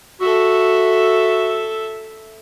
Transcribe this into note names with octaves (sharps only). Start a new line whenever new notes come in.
F#4 A4 E5